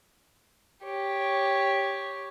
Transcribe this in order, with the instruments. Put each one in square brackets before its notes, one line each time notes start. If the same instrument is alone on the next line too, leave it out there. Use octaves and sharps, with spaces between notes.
[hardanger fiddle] G4 C#5